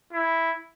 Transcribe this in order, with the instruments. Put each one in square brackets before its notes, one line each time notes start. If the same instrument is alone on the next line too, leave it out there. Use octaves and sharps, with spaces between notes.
[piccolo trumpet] E4